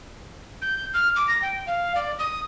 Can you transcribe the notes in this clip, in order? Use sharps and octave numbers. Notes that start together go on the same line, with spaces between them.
G6
F6
D6
A#6
G5
F5
D5
D#6